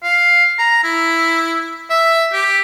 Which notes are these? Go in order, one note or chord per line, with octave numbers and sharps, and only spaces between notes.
F5
A#5
E4
E5
G4